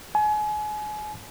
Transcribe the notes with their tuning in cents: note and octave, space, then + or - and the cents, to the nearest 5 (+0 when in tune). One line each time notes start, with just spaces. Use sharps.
G#5 +30